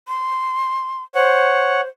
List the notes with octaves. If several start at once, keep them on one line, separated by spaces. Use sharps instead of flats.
C6
C5 C#5 F#5